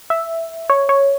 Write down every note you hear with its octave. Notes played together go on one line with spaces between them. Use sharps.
E5
C#5
C#5